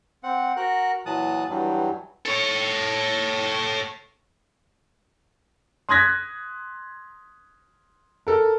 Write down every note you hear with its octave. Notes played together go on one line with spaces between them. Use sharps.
C4 F#5
F#4 A#4 F#6
A#2 E3 F#3 A5 D#6 F#6
G2 E3 F#3 G3
A4 C#5
C6 D#6 F#6 G#6 A#6 B6
A4 A#4